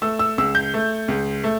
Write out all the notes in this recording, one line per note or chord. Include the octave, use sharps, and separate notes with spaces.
A3 E6
E6
C#2 E6
G6
A3
C#2
A3